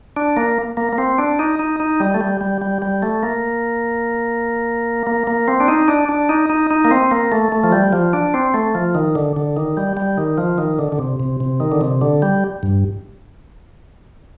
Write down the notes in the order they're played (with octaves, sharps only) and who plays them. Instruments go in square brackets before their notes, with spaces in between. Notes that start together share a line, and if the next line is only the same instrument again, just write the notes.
[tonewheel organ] D4
A#3
A#3
A#3
C4
D4
D#4
D#4
D#4
G3
A3
G3
G3
G3
G3
A3
A#3
A#3
A#3
C4
D4
D#4
D4
D4
D#4
D#4
D#4
A#3
C4
A#3
A3
A3
F3
G3
F3
D4
C4
A3
F3
D#3
D3
D3
D#3
G3
G3
D#3
F3
D#3
D3
D3
C3
C3
C3
D#3
D3
C3
D3
G3
G2